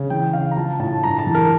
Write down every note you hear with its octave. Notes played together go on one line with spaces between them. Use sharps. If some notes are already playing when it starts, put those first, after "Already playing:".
Already playing: C#3
E3 G5
C#3 F5
A#5
F3 A5
A2 A5
G2 A#5
A5
E3
A#4